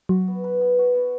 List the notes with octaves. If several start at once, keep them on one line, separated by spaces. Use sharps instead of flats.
F#3 F#4
B3
B4
B3
F#4
B3